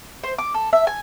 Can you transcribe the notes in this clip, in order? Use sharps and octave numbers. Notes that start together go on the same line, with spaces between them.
C5
D6
A4
E5
G#5